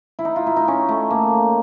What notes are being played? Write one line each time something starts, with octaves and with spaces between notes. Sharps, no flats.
E4
D#4
F4
E4
D#4
C#4
A3
A#3